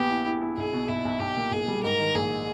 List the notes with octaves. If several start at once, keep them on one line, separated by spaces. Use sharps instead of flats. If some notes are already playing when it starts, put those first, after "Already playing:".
Already playing: A#1 B3 G4
E4
E4
E4
B1 G#4
B2
B1 E4
B1
B1 G4
A#2
B1 G#4
G3
G#2 A#4
D#3
A#1 G#4